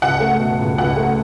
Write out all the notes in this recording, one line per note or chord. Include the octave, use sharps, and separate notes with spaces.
C#2 F#5
A3
B2
C#2
C#2 F#5
A3